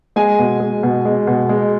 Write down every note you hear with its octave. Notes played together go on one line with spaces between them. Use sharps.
G#3 G#5
B2
G#3
B2
G#3
B2
G#3